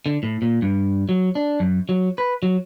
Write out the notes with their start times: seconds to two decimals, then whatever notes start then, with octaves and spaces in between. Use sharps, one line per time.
0.06 D3
0.23 A2
0.42 A#2
0.62 G2
1.09 F#3
1.35 D4
1.60 F#2
1.89 F#3
2.18 B4
2.43 F#3